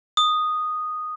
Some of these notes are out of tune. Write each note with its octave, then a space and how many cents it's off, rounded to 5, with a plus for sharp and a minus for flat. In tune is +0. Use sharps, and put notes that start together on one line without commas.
D#6 -5